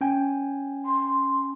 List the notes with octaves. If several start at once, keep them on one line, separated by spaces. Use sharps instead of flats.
C#4 G5 G#5
C6